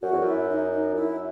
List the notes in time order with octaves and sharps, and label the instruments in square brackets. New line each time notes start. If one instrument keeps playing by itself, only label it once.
[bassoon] F#2 [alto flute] F#4
[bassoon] E2
[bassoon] F#2 [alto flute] E4
[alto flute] D#4
D#4
[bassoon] F#2 [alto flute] E4